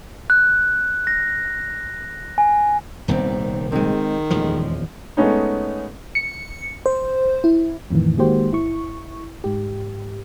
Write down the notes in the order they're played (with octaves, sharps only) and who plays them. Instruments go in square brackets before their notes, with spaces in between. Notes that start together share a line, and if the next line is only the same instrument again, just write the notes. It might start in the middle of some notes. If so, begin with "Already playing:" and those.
[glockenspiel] F#6
A#6
G#5
[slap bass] D#1 C2 [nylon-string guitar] D#3 B3 C4
[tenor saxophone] D#3 [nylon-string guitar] G#3 C4
[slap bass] D#1 E2 F3 [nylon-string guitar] G#3 A3
[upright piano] G#3 A3 B3 C#4 D#4
[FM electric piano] C#7
C5
E4
F2 A2 D#3 E3
D#3 G#3 A#3 F#4 G4 C5
G1 E4 C#6
G#2 G4